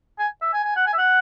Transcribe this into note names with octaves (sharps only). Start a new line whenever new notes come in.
G#5
E5
G#5
G#5
F#5
G#5
E5
F#5